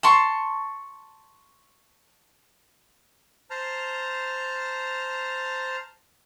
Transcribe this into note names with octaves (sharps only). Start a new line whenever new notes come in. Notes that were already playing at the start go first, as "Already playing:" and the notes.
A5 C6 C#6
C5 A5 A#5 F6